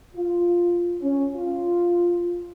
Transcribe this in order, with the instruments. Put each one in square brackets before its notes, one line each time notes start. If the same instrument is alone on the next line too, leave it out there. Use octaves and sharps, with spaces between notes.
[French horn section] F4
C#4
F4